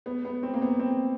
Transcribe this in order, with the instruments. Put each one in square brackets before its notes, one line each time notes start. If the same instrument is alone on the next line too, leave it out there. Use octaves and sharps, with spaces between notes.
[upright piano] B3
B3
C4
A#3
B3
C4